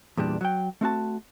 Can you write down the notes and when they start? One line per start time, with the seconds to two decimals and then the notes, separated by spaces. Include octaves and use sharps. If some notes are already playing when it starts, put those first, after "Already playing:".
0.17 E2 A#2 G3 D4
0.41 F#3 G5
0.81 A3 C4 F#4 A5